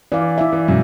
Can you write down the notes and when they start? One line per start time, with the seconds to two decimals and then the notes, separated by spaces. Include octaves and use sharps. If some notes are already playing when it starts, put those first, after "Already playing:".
0.12 E3 D5 F5
0.38 E4 D5 E5
0.52 E3
0.68 F#2 B2 G#3